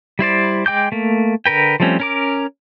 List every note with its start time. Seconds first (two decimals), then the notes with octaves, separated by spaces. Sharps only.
0.19 G3 E4 C5 D5
0.66 G#3 G5 D6 G6
0.92 A3 A#3
1.46 D3 A#4 B4 G5
1.80 F3 G3 A3 C4 C#4
2.00 C#4 A#4 D6